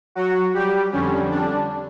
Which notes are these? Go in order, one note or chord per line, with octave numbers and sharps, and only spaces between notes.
F#3 F#4
G3 G4
F2 D3 G3 C#4
D4